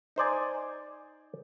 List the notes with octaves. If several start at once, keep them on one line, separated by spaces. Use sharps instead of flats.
D#4 C5 D5 G#5